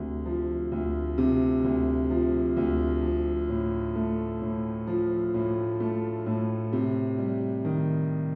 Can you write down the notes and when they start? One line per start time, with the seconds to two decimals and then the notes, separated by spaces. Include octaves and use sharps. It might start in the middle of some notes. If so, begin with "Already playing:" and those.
Already playing: D2 C3
0.25 F3
0.72 D2
1.18 C3
1.64 D2
2.10 F3
2.57 D2
3.03 F3
3.49 A2
3.95 A3
4.42 A2
4.87 F3
5.34 A2
5.80 A3
6.26 A2
6.73 C3
7.18 G3
7.65 D#3